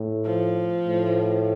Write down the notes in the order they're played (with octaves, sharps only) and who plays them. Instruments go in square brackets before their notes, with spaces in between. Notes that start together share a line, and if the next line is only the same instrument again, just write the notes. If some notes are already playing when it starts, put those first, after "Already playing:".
Already playing: [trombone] A2
[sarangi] F3
[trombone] A2